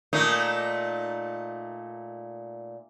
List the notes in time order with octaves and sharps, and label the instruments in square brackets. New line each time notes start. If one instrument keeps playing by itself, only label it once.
[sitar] A#2 A3 D#4